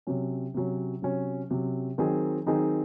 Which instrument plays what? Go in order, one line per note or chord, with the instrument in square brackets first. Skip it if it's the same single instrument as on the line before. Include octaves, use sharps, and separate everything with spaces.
[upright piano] C3 F#3 C#4
C3 F#3 C#4
C3 F#3 C#4
C3 F#3 C#4
D#3 F#3 C4 D#4 G#4
D#3 F#3 C4 D#4 G#4